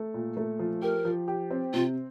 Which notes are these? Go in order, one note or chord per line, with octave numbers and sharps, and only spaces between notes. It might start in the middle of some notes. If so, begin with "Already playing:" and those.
Already playing: A3
A#2
A3
F3
G4 A#4
F3
G4
C4
C3 F4